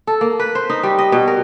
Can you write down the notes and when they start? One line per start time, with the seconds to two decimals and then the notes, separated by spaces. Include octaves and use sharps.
0.07 A4
0.21 A#3
0.40 B4
0.55 C5
0.70 D#4
0.83 G3
0.98 D#5
1.12 B2
1.28 A#4